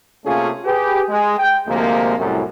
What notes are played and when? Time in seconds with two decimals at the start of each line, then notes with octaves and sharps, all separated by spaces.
0.25 C3 A3 A#3 C#4 F4 G#4
0.65 G4 G#4 B4
1.09 G#3
1.38 G5
1.68 D2 C3 F3 G#3 A#3
2.18 C2 F#2 A2